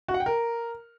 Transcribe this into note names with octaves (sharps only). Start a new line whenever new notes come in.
F#4
F#5
G5
A#4